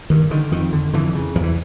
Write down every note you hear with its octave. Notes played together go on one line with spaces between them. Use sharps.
G2 D#3
D3 D#3
F2 D#3
D3
F2 D3 E3
C#3
E2 F3
E3